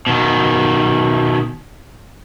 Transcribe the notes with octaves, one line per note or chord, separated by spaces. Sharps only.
B2 D#3